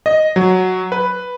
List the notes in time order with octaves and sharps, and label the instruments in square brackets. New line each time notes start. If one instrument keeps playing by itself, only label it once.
[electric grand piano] D#5
F#3
B4